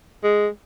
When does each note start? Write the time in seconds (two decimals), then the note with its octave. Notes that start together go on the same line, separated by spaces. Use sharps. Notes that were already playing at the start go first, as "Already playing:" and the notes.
0.23 G#3